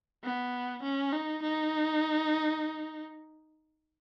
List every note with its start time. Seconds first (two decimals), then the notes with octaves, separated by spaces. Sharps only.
0.24 B3
0.83 C#4
1.13 D#4
1.42 D#4